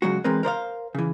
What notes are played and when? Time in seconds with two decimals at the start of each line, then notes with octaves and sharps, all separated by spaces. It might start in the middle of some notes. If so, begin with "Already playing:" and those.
0.02 C#3 F#3 G#3 F#4
0.24 E3 G#3 C4 A#4 B4
0.43 A#4 C5 D5 F5
0.95 C#3 E3